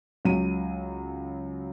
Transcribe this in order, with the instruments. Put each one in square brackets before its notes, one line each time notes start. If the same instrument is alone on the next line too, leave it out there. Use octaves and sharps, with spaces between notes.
[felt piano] C#2 F#3 D#7